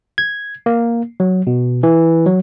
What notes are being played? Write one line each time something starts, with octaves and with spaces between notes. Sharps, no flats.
G#6
A#3
F#3
B2
E3
F#3